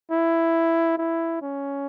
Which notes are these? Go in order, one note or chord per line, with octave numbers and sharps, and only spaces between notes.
E4
E4
C#4